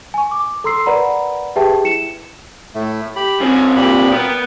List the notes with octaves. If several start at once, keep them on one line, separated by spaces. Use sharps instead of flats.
G#5 C#6
D6
A4 A#5 C6 E6 C7
A#4 B4 D5 F#5 A#5 B5
G4 G#4 B4 E5 G5 A5
E4 C#7 E7
A2 A3
G4 B5
G2 C4 C#4
A#2 G4 B5
B3 A#4 G5